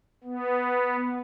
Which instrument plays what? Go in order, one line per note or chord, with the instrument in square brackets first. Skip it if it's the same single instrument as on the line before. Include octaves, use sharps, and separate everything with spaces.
[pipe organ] B3